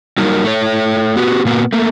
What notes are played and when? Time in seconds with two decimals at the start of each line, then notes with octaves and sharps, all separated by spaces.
0.18 F#3 G3 A#3 D#4 A#4
0.45 A3 C#5
1.16 B3 F#4 G4 B4
1.45 A#2 A#3 B3 F#4
1.73 A3 A#3